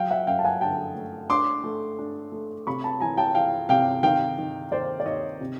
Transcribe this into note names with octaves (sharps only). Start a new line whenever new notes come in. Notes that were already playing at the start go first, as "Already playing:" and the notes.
Already playing: F#3 F5 G5
E5 F#5
F#2 F5 G5
A5
F#5 G#5
D3 G5 A5
A3
D4 C6 D6
A3
D4
A3
C3 B5 C#6
A5 B5
E3 G#5 A#5
G5 A5
E3 F5 G5
C3 F5 G5
D#3 F5 G5
D#3
D#2 C5 D5
D5
D#2 C#5 D#5
C3